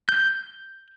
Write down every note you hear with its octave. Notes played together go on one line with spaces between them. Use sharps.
G6